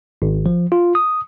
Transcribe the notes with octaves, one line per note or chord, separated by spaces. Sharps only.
G#1
F3
F4
D#6